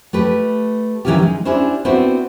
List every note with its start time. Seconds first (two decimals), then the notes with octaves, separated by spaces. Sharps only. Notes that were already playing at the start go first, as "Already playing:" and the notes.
0.13 A3 G4 B4
1.05 D#3 E3 A#3 C#4 F4 G4
1.18 G#3 D#4
1.45 C#4 D4 E4 G4 C5
1.85 B3 C4 D4 E4 F#4 C5